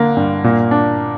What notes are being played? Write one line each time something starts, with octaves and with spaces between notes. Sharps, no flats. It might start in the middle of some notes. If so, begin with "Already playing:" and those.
Already playing: D3 A#3
G2
A#2
D4